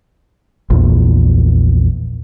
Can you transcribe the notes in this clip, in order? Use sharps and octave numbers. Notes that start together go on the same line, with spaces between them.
A#1 E2